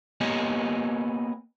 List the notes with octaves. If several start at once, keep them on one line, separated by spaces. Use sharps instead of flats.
A#3 B3 G4 C#5 D#5 G#5